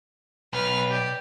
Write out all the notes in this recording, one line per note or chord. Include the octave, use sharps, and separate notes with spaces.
B1 B4 F6
G4 D5